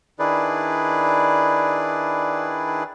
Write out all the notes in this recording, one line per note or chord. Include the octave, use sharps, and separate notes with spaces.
D#3 D4 E4 G#4 B4 D5